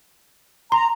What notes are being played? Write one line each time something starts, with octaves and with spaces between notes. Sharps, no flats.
A#5 C6